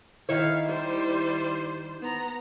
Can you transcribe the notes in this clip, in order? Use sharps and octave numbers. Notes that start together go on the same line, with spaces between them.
D#3 E4 C#5 F5
G3 C5
B3 A#5